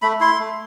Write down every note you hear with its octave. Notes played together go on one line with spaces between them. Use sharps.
A3 B5
E4 C6
A3